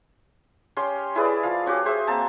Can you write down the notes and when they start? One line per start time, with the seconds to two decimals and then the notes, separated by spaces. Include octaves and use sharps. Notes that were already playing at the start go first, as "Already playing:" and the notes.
0.77 C#4 G4 C6
1.15 E4 G#4 B4 D5
1.43 F3 F5
1.66 C#4 F#4 G4 D6
1.85 G#4 C5 E5
2.07 A#3 C4 A5